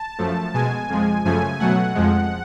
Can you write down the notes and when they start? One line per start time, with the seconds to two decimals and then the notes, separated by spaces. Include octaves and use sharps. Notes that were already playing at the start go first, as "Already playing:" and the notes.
Already playing: A5
0.18 F#2 F3 A3
0.54 B2 G#3 G#5
0.90 F2 F3 G#3
1.25 F#2 C#3 F3 A3 G#5
1.60 B2 F#3 A3 F#5
1.95 F2 F3 G#3